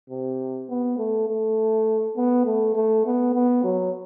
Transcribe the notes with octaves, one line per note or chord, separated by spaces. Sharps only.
C3
B3
A3
A3
B3
A3
A3
B3
B3
F#3